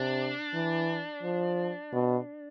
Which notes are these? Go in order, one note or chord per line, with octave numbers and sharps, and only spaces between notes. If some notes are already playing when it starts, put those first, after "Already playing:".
Already playing: C3 D4
E3
F3
B2